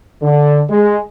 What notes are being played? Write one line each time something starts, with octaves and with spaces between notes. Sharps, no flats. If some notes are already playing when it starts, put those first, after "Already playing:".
D3
G#3